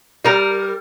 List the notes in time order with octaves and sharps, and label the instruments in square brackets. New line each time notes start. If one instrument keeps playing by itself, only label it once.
[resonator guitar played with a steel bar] G3 A#4